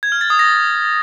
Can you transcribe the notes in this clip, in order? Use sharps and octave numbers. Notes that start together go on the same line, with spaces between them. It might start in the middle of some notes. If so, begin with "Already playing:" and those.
G#6
F6
A6
D#6
A#6